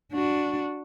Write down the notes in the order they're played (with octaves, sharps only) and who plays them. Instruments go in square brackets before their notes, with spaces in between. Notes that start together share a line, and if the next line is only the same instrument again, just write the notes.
[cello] D4 F#4